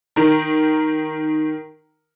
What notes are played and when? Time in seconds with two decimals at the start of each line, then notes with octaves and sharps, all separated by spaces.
0.16 D#3 A#4